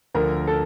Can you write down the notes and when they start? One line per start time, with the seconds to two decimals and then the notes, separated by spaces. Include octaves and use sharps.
0.15 D2 D3 F3 A#4
0.47 A4